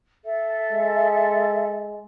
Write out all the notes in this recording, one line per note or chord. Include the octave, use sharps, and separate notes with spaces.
A4 E5
G#3